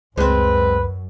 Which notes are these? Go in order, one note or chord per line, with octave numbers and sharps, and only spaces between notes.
C#2 F#2 G#3 C4 B4